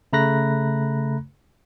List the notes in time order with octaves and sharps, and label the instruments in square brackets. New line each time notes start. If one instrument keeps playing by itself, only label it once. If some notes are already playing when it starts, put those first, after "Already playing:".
[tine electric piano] C#3 A3 A#5 B5 F#6 A#6